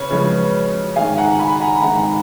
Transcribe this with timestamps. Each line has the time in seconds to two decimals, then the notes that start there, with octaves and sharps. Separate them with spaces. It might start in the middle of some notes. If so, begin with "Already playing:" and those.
Already playing: C#3 B4 C#5
0.11 C#3 F3 G#3
0.96 G#2 D#3 G#3 F5 G#5
1.18 F#5 A#5
1.39 G#5 B5
1.60 F#5 A#5
1.82 G#2 D#3 G#3 F#5 A#5